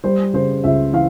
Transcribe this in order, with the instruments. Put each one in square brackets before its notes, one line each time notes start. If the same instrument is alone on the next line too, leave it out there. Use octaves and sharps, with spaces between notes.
[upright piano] G3 C5
C#3 C5
C#2 E5
E3 F5